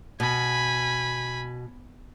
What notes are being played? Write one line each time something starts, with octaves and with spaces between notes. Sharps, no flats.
B2 G#5 B5